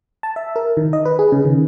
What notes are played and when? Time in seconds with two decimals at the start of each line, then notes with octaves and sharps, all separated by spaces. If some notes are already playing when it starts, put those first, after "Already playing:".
0.23 A5
0.36 E5
0.56 A#4
0.77 D#3
0.93 D#5
1.05 B4
1.19 G#4
1.32 C#3
1.45 D#3